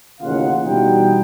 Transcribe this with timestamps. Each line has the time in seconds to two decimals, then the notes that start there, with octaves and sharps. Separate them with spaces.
0.21 A1 D#2 C#3 F4 F5 F#5
0.65 B2 E3 G3 B3 D#4 G5